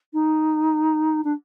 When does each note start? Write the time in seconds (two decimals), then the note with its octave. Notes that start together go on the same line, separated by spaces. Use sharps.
0.13 D#4
1.24 D4